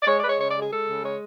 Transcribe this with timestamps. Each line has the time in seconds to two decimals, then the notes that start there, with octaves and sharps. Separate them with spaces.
0.03 D5
0.07 G#3 C#5
0.18 D5
0.23 G#3 B4
0.29 C#5
0.39 C#3 C#5
0.50 D5
0.56 G#3
0.61 G#4
0.71 G#3 A4
0.87 C#3
1.03 G#3 C#5